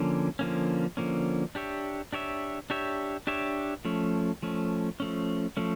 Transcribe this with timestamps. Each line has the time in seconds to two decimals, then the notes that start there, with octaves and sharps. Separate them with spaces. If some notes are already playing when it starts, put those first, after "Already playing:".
Already playing: D3 F3 A#3 C#4
0.39 D3 F3 A#3 C#4
0.97 D3 F3 A#3 C#4
1.55 D4 G4 C#5 E5
2.12 D4 G4 C#5 E5
2.70 D4 G4 C#5 E5
3.27 D4 G4 C#5 E5
3.85 F3 A3 C#4
4.43 F3 A3 C#4
5.00 F3 A3 C#4
5.57 F3 A3 C#4